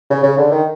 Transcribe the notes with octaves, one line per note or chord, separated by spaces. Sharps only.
C#3
C#3
D3
D#3